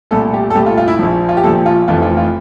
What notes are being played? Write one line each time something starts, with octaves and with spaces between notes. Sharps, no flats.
C2 A#2 A3 A4
G4
A4
C2 A#2 A3 G4
F4
F4
E4
A#1 A#2 F3
F4
G4
A#1 A#2 F3 A4
F4
F1 F2 E3 A3 F4
F4
F4